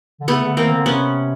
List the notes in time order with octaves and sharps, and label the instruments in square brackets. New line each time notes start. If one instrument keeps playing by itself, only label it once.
[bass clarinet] D3
[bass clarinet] C#3 [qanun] A3 B3
[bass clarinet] D3
[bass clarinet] D#3 [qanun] A#3 C4
[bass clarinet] D3
[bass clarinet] C3 [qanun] B3 C#4